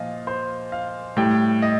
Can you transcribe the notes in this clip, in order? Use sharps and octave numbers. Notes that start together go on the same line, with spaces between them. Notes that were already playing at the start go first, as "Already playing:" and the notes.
Already playing: A#2 F3 D#5 F5
C5
F5
A2 G3 G5
D#5